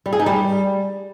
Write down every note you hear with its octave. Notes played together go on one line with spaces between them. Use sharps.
G3
G#4
D#4
G3